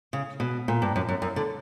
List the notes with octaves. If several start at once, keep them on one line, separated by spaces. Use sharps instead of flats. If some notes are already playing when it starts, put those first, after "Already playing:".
C#3
B2
A#2
G2
F#2
F#2
F#2
D3